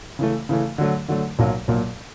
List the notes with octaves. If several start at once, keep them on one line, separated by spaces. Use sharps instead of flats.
C#3 E3 A3
C#3 E3 A3
D3 F#3 A3
D3 F#3 A3
B1 A#2 F#3 A#3
B1 A#2 F#3 A#3